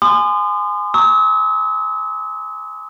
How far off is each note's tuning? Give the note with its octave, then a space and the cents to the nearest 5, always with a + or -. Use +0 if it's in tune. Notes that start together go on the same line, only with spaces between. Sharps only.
G#5 +0 C6 -30 D#6 -35
A#5 -25 C#6 +15 E6 -45